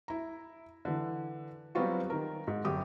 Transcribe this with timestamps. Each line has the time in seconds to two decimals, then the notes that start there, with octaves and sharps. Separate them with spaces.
0.08 E4 A#5
0.85 D3 E3
1.75 F#3 G3 B3 C4 F4 F#4
2.10 D#3 A#4
2.47 G#2
2.65 G1 F#2 G4 G5 D6 D#6